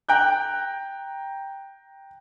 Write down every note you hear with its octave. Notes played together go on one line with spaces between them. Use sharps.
G5 A#5 F#6 G6